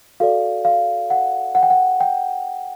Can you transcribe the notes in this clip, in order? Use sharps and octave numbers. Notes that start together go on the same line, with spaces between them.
F#4 A4 D5 F5
F5
F#5
F#5
G5
F#5
G5